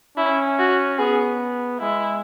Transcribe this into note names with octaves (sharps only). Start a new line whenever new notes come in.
C#4 E4
F#4
B3 G#4
G#3 E4